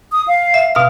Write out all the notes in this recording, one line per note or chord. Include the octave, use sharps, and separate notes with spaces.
D#6
F5
E5
B2 F5 F6